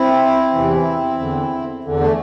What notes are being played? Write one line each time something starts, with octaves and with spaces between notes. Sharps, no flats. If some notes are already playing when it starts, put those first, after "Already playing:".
Already playing: C4 E4
E2 C3 E3
E2 D3
E2 D3
A3